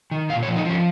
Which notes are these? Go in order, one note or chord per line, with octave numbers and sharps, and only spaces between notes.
D#3
A#2 F5
C#5
F3
D#4
F3 C#4